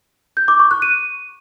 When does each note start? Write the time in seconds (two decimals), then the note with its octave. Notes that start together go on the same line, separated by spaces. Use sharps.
0.37 G6
0.48 D6
0.59 C#6
0.71 F#6
0.82 D#7